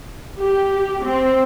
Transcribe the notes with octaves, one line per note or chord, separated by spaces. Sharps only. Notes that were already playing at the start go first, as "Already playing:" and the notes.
G4
C4